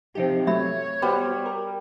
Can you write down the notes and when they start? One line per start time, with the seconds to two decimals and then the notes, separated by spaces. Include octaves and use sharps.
0.15 C3 F3 C4 D#4 G4
0.47 F#3 A3 C#5 E5 B5
1.02 G3 B3 F#4 C5
1.46 A#4